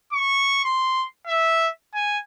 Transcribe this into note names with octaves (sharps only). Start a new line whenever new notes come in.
C#6
C6
E5
G#5